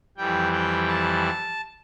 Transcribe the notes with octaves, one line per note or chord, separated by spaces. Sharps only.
F2 E3 G3 G5
G5
A5